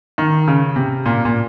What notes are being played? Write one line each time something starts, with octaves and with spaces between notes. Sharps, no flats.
D#3
C#3
C3
A#2
A#2